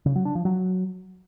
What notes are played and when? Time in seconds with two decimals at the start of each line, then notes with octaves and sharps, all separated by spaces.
0.06 C#3
0.16 F#3
0.25 D4
0.35 F3
0.45 F#3